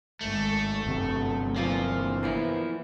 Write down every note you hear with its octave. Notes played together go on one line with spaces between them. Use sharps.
G#1 A3
G1 F#2 C3
F#3
E3 F3 A#3 F4
A#3 B3 E4